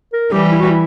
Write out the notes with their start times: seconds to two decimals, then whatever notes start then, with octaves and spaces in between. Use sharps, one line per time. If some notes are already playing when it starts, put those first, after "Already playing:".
0.13 A#4
0.32 E3 G3 G4
0.51 E4
0.60 F#4
0.70 E4